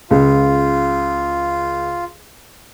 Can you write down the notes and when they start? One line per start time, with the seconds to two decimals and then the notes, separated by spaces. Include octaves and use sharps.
0.11 C#2 F4